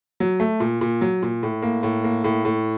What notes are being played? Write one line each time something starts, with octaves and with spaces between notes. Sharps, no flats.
F#3
A3
A#2
A#2
F#3
A#2
A2
A#3
A2
A#3
A2
A2